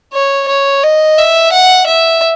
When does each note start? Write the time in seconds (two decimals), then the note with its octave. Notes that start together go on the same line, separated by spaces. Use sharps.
0.13 C#5
0.48 C#5
0.83 D#5
1.18 E5
1.52 F#5
1.87 E5